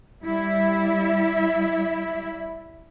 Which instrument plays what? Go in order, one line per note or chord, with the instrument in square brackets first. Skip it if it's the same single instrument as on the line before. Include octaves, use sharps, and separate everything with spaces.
[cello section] G3 E4 E5